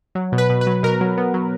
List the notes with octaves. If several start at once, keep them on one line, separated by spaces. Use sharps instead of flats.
F#3
B2
B4
B2
B4
F#3
B2 A#4
F#3
B3
F#3